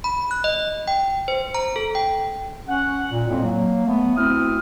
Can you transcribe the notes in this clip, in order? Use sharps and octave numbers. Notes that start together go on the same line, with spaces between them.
B5
F#6
D#5
G5
C5
A#5
A4
G5
C#4 F#5
A#2
F2 A2 G#3 A#3 C4
F#3 A#3
A3 B3
D2 C4 E4 D#6 F6